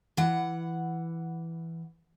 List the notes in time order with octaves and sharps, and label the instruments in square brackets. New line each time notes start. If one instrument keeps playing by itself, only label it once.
[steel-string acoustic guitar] E3 F#5